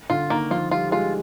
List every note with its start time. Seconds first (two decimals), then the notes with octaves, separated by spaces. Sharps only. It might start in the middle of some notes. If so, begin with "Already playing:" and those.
0.10 D3 F4
0.30 D#3 A#3
0.50 F3 F4
0.71 G3 F4
0.87 G3
0.91 G#3 F4